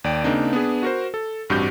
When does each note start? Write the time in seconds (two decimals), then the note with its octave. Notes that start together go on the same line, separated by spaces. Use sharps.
0.04 D#2 D5 G5 D7
0.24 C#3 A#3 C4 D4 D#4
0.53 B3 D4 G#4 B4
0.83 F#4 A#4 C5
1.14 A4
1.49 A1 G2 C4 F#4 G4 G6